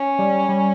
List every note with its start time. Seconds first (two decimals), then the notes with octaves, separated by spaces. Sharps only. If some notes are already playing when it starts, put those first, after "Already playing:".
Already playing: C#4
0.19 G3
0.49 G3